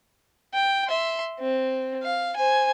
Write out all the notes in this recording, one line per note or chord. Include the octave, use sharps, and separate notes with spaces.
G5
E5 C6
C4
F5
C5 G#5